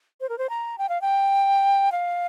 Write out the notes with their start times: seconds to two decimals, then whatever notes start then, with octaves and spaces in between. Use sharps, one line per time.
0.21 C5
0.29 A#4
0.38 C5
0.50 A#5
0.78 G5
0.89 F5
1.01 G5
1.92 F5